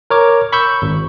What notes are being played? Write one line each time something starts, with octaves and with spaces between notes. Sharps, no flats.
A#4 C#5 D6
B5 C#6 E6 G6
G#1